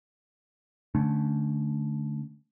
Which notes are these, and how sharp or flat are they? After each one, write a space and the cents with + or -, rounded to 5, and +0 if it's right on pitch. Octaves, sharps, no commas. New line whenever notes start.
D3 +0 A3 -15 C#4 +0